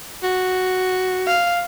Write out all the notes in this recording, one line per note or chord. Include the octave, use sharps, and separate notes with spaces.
F#4
F5